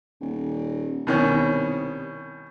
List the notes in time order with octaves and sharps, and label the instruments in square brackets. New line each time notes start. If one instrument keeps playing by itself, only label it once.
[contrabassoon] D#1
[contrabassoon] C2 [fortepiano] B2 D#3 C#4